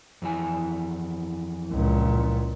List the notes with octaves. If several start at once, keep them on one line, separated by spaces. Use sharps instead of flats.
F2 E3 G#5
C#2 A#2